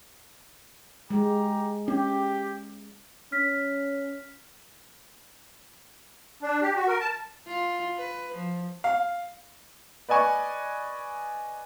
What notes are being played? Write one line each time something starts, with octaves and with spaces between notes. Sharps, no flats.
G#3 G4 A#5
C#4 G4
C#4 F6 B6
D4
G4
F#4
A#4
A5
F4
B4
F3
F5
B4 D5 D#5 G#5 C#6